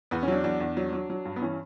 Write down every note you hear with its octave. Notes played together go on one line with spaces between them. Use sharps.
E2 B3
C#4
F#3 D4
E2 D4
E2
F#3
F#3
F#3
G2
B3
E3 C#4